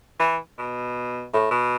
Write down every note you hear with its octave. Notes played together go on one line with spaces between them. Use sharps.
E3
B2
A2
B2